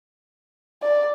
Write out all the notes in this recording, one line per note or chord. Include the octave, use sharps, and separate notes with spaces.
D5